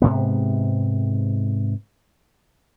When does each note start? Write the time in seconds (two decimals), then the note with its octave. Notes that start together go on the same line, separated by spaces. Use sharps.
0.02 G#2 C3 B3